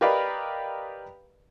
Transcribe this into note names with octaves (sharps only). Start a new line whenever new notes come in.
G4 A#4 B4 D5 D#5 F5